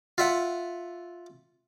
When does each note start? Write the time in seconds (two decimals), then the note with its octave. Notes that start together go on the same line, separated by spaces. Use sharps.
0.18 F4 E5 F#5